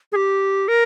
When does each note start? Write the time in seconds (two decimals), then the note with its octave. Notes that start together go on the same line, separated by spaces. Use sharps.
0.12 G#4
0.16 G4
0.68 A#4